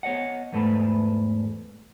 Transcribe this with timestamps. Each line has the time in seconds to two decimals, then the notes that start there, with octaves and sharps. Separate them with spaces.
0.03 B3 C#5 D#5 F#5
0.52 E2 G#2 A3 B4 A5 B5